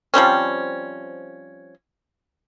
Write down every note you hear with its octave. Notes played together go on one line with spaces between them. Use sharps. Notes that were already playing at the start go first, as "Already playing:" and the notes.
F3 G3 C4 C#4